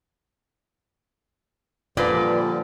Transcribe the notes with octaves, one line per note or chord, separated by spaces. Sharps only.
A#2 D3 F3 G3 B4 D5